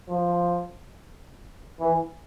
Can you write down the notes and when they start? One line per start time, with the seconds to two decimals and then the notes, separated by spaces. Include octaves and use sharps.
0.09 F3
1.80 E3